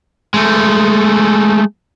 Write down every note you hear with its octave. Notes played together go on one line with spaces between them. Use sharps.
G#3 A3